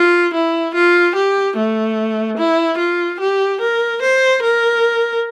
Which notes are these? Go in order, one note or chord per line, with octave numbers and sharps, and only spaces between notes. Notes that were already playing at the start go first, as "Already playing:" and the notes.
Already playing: F4
E4
F4
G4
A3
E4
F4
G4
A#4
C5
A#4